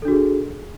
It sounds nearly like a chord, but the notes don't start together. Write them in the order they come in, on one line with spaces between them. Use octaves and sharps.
A4 D4 F#4 G#4